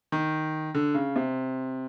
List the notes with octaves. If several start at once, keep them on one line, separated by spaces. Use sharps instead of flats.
D#3
D3
C#3
C3